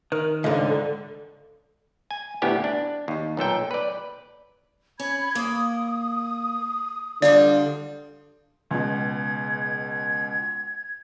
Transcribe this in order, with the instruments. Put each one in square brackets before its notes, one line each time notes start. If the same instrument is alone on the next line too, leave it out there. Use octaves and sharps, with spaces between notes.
[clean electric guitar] D#3 [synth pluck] A#4
[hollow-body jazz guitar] C#2 G#2 [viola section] D3 [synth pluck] D#5
[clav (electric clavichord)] G#5
D2 A2 B3 E4 G4 G#5
D4
D#2
B1 A#2 A4 G5
B4 D5
[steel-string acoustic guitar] C#4 [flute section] B5 G#6
[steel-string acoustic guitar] A#3 [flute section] D#6
[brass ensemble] D3 [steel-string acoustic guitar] G3 D4 F4 [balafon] D5
[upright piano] C#2 B2 [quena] G#6